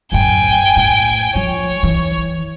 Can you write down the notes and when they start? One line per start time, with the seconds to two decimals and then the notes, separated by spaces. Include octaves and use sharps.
0.12 F#2 A2 G5 G#5
0.76 A2
1.35 F3 C#5
1.83 E3